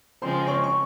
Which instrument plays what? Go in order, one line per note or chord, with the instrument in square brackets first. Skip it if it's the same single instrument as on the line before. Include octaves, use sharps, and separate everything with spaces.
[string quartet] C#3 F3 G#3 C4 [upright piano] C5 C6
[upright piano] C#5 C#6
C#6